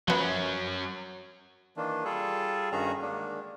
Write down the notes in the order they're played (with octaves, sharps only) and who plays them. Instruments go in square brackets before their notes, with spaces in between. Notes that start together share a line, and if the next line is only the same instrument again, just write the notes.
[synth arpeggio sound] F3 B3 [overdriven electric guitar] F#3 C#4
[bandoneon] D#3 E3 A#3 D4
G3 F4 G#4 A4
G2 D#3 C#4 F#4 G#4 A#5
D3 D#3 G#3 A#3 D4